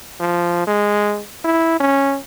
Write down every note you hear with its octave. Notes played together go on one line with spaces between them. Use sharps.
F3
G#3
E4
C#4